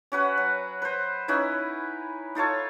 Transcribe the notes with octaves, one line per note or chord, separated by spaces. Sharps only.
C#4 F#4 B4 F#5
F#3
B4 C5
C#4 D#4 E4 B4
D#4 F4 A4 C#5